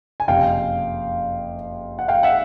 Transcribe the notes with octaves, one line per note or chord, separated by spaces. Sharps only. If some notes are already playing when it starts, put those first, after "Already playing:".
G#5
F#1 F2 C3 F5 G5
F#5
F5 G5
E5 F#5